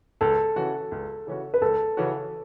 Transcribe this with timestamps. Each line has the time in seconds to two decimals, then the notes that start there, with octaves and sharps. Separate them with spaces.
0.21 C#2 A4
0.56 C#3 E3 C#4 F#4
0.92 C#2
1.27 C#3 E3 C#4 F#4
1.54 B4
1.61 C#2 A4
1.97 C#3 E3 C#4 F#4